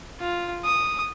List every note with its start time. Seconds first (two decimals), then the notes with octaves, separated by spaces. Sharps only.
0.20 F4
0.64 D#6